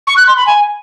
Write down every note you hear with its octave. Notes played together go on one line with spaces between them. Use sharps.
C#6
F#6
C6
B5
G#5